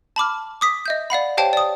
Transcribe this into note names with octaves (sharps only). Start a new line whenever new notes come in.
A5 B5 D6 F6
D6 D#6 B6
D#5 E5 G6
D5 F5 F#5 B5
G4 C5 C#5 F5 G5 A5
D5 D#6